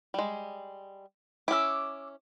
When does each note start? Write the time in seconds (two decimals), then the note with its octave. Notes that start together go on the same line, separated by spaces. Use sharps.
0.14 G3 G#3
1.48 C#4 E4 D6 E6